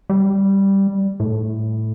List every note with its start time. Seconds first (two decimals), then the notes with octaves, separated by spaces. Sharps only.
0.10 G3
1.20 A2